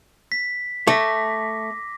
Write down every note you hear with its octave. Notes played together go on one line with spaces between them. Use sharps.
B6
A3 D6 A#6